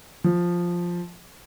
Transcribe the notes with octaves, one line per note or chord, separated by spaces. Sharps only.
F3